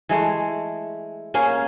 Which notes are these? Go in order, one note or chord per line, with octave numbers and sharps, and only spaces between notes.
E3 G#3 A3
A#3 C#4 G#4